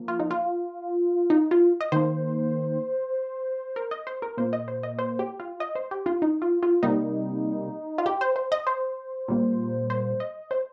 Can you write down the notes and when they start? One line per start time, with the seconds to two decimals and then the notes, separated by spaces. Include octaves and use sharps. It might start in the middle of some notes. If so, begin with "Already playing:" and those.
Already playing: F3 A#3
0.08 F4
0.19 D#4
0.31 F4
1.30 D#4
1.51 F4
1.81 D#5
1.92 D#3 A#3 C5
3.76 A#4
3.91 D#5
4.07 C5
4.22 A#4
4.37 A#2 A#3 C5
4.53 D#5
4.68 C5
4.83 D#5
4.99 C5
5.19 G4
5.40 F4
5.60 D#5
5.75 C5
5.91 G4
6.06 F4
6.22 D#4
6.42 F4
6.63 F4
6.83 C3 G3 A#3 D#4
7.98 F4
8.06 G4
8.21 C5
8.36 C5
8.52 D#5
8.67 C5
9.28 A#2 G3 A#3
9.90 C5
10.20 D#5
10.51 C5